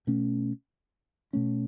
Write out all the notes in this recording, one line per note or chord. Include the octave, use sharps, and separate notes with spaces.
B2 A3 C#4
B2 A3 C#4